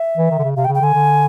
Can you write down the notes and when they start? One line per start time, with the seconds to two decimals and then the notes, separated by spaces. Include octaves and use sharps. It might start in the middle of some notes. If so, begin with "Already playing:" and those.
Already playing: E5
0.18 E3
0.30 D#3
0.39 D3
0.43 C#3
0.56 C3 F5
0.65 G5
0.68 C#3
0.75 G5
0.81 D3 G#5
0.94 D3